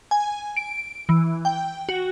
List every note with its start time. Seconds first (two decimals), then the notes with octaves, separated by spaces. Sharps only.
0.11 G#5
0.57 D7
1.09 E3
1.45 G5
1.89 F#4